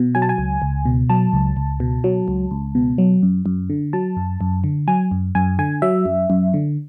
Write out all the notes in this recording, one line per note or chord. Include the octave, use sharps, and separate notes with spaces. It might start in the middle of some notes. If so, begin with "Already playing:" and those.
Already playing: B2
F#3 G#5
A5
G#5
C#2
C#2
B2
F#3 A5
C#2
C#2
B2
F#3
C#2
C#2
B2
F#3
F#2
F#2
D3
F#3 A5
F#2
F#2
D3
F#3 G#5
F#2
F#2 G#5
D3 G#5
F#3 E5
F#2
F#2
D3